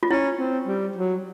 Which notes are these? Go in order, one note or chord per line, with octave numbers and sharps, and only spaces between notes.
F4
C#4 E4
C4
G3
F#3